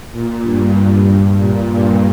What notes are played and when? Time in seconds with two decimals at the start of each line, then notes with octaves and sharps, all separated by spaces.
0.12 A#2
0.42 G2
0.74 G2
1.05 G2
1.36 A#2
1.67 G2